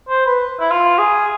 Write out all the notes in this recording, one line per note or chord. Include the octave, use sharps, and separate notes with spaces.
C5
B4
E4
F4
G#4